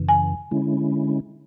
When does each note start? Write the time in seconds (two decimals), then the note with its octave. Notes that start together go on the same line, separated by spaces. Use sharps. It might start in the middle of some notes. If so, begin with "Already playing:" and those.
Already playing: F#2 C#3 E3
0.09 G#5
0.51 D3 G#3 C#4 E4